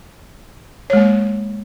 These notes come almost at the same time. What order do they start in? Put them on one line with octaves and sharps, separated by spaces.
C#5 G#3 A#3